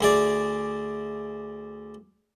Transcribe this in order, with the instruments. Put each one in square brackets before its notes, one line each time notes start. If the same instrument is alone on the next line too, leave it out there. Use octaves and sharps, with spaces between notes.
[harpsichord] D2 G#4 D5